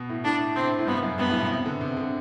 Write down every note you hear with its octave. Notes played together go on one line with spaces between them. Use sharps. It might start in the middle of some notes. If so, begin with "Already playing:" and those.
Already playing: B2
A2
A2 D4
C3 C4
A2
G2 B3
F#2
G2 B3
A2
B2
C3
D3
C3
D3